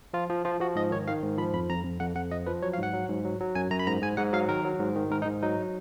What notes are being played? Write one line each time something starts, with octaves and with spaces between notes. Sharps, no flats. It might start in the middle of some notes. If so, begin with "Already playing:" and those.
F3 F4
F3
F3 F4
F3 F#4
G#2 D#5
D#3 C#5
D#3 F5
G#2
F3 B5
F2 B5
F2 A#5
F2
F2 F#5
F2 F#5
F3 D#5
F3 B4
F#3 C#5
F5
G#2 F#5
F#3
G#2
F#3
F#3
F#2 G#5
F#2 A#5
B5
G#2 A#5
G#2 G#5
G#2 F#5
F#3 F5
D#3 A#4
F#3
G#2
D#3
G#2 A#4
D#4
G#2
F#3 D#4